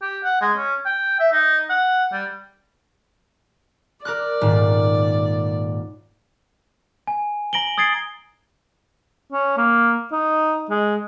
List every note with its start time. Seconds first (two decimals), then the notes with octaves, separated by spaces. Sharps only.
0.02 G4
0.24 F#5
0.41 G#3
0.57 C#4
0.86 G5
1.19 E5
1.32 D#4
1.70 F#5
2.12 G3
4.05 A#4 D5 D6 F#6
4.41 D#1 G#2
7.07 G#5
7.53 A#5 A#6 D7 F#7 G7
7.78 D#6 G#6 A6 C7 D7
9.32 C#4
9.57 A#3
10.12 D#4
10.70 G#3